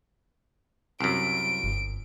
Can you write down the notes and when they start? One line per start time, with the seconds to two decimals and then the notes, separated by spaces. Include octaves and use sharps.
1.00 C2 F#2 D7
1.63 G1